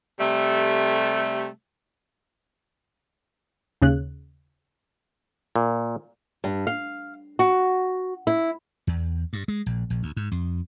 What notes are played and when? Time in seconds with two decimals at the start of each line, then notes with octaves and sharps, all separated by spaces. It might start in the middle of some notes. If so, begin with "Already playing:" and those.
0.20 C3 G3 A3
3.82 D#2 C#3 F#6
5.56 A#2
6.44 G2
6.67 F5
7.39 F#4
8.27 E4
8.87 E2
9.33 G2
9.48 G#3
9.66 A#1
9.90 A#1
10.03 D2
10.17 G#2
10.31 F2